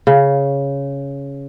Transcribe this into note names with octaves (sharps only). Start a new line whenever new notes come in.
C#3